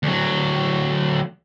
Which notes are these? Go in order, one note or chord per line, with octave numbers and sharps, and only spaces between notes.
D2 F#3